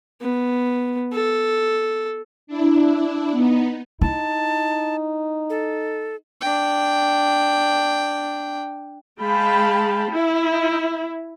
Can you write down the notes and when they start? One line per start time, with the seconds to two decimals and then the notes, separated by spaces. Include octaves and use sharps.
0.21 B3
1.13 A4
2.47 D4 E4
3.31 B3 D#4
4.01 D#4 E4 A5
5.50 A4
6.41 D4 G5
9.20 G#3 F5 G5 A5 B5
10.11 E4